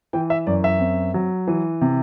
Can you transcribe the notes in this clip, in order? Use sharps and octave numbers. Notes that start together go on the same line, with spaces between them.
E3 G5
E5
F#2 D5
E5
C4
F#3
E3
C3